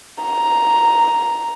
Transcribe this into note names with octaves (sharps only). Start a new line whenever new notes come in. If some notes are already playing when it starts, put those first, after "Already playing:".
A#5